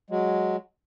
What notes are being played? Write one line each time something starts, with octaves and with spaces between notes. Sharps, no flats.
F#3 G#3